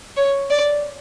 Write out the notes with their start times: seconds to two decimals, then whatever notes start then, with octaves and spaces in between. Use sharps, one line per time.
0.17 C#5
0.50 D5